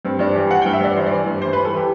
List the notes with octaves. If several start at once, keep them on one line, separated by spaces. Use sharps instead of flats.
G2 C4
G2 D4
E3 G4
E3 F#5
G2 G5
E5
G2 D5
E3 C5
E3 D5
G2
G2 C5
E3 B4
A4
E3 G4